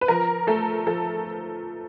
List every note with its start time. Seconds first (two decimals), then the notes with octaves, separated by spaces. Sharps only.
0.01 B4
0.08 F3 A#4
0.47 A3 A4
0.86 F3 A4